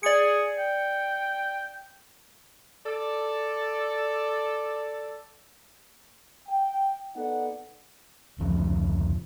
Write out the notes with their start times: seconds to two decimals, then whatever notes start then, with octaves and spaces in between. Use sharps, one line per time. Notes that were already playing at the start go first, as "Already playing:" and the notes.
0.03 G#4 D5 C#7
0.58 G5
2.85 A4 D5
6.47 G5
7.15 B3 D#4 A4 D5 F#5
8.39 F1 C#2 F3